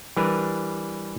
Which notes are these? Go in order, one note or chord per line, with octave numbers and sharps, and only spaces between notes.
E3 G3 D4 A#4 B4 G#5